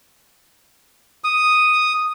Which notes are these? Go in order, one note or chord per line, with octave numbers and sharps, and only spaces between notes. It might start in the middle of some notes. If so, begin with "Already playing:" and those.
D#6